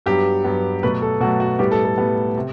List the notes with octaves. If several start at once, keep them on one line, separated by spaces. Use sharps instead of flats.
G2 F#3 B3 G4
G2 F#3 B3
B2 F#3 A3 B4
A4
B2 F#3 A3 F#4
F#4
A2 G3 B3 G4
A4
A4
A2 G3 B3
C3